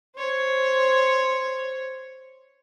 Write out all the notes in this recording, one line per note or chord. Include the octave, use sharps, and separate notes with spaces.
C5 C#5